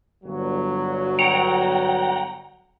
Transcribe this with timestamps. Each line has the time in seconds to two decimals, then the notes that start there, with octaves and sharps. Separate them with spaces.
0.24 G1 F#3
1.19 F#5 G5 A#5